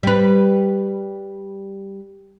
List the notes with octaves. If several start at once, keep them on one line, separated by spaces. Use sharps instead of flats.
G3 B4